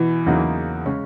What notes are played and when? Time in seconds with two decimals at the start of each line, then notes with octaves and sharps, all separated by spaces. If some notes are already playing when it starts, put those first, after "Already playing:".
Already playing: B2 E3
0.26 E2 C#3 F#3 A#3 D#4
0.86 C#3 G#3 C#4